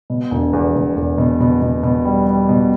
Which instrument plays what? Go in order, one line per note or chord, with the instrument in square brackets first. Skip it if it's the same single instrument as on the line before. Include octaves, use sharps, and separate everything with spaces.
[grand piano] B2
E1
E2
E1
E2
B2
B2
B2
B2
G3
G3
B2